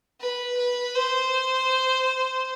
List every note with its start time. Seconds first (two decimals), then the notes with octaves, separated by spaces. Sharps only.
0.20 B4
0.57 B4
0.95 C5